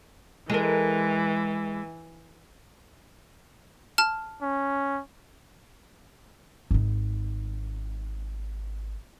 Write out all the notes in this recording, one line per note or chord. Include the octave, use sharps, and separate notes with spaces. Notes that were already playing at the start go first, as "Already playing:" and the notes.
E3 G#3 A4 A#4
A5 F6
C#4
G#1 D#4